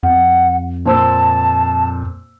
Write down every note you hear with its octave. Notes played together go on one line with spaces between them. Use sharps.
F2 F#5
A#2 C5 A5 E6